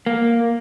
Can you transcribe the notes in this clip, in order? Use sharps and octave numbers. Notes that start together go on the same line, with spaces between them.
A#3